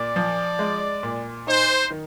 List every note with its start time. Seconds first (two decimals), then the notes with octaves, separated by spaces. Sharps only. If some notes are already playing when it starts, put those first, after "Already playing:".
Already playing: A#2 D5
0.16 F3
0.59 G#3
1.03 A#2
1.47 D#4 C5
1.91 D#3